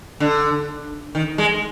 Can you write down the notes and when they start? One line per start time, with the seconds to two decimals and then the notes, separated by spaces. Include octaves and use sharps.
0.20 D3
1.15 D#3
1.38 G#3